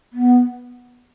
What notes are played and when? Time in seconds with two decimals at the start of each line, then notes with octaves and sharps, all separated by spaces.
0.13 B3